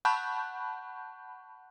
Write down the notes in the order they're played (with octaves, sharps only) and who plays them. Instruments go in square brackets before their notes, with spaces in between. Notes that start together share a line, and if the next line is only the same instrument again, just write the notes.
[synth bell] F#5 A5 B5 C#6 F#6 G6